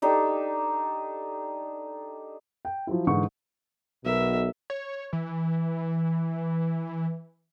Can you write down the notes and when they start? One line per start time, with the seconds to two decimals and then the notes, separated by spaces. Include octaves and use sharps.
0.02 D4 D#4 G4 A4
2.65 G5
2.87 F3 F#3 E4
3.07 G#2 D3 E3 C#6
4.05 B1 B2 A#4 E5
4.70 C#5
5.13 E3